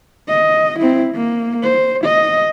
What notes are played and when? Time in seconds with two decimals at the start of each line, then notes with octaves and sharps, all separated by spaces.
0.28 D#5
0.79 C4 E4
1.14 A#3
1.63 C5
2.04 D#5